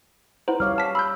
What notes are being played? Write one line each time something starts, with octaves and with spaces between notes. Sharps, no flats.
E4 B4 C5 F#5 A#5
G3 C#5 F5 D6 F6
A5 B6
B5 E6 G6